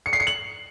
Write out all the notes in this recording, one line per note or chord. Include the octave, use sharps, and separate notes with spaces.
C#7
C7
C#7
F#7